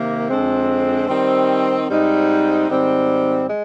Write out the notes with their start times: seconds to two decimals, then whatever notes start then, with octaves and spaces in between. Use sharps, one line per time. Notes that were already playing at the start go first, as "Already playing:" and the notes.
Already playing: C3 D#3 A#3
0.28 F2 D3 G#3 C4
1.08 D#3 G3 C4
1.88 G#2 G3 C4 D#4
2.68 G#2 D#3 G3 C4
3.48 G#3